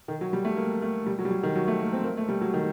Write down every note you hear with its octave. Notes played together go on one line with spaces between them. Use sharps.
D#3
F#3
G3
A3
A#3
A3
G3
F#3
G3
F#3
D#3
F#3
A3
A#3
C4
A#3
A3
G3
F#3
D#3